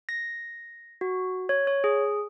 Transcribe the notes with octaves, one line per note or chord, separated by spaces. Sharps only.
A#6
F#4
C#5
C#5
G#4